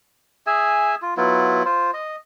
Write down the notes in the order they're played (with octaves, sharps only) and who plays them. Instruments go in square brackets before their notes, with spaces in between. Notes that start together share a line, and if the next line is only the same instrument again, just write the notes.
[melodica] G#4 E5 G#5
F4
F#3 B3 E4 F4
F4 C5
D#5